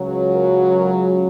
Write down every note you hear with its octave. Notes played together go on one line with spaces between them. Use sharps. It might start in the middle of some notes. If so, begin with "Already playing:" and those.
Already playing: C#2 C#3 F#3
A#4
A#4